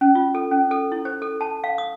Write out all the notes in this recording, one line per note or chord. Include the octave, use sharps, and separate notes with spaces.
C#4
F4
A4
C#4
A4
E4
C5
A4
A5
F5
D#6